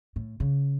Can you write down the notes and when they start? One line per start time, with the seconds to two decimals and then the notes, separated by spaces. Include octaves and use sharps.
0.16 A2
0.40 C#3